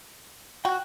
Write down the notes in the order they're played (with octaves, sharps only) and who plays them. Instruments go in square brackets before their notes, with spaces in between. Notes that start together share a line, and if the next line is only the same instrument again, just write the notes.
[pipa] F#4 [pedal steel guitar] G5 F#6